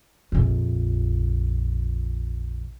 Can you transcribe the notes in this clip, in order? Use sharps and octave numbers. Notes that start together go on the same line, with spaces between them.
A#1 F2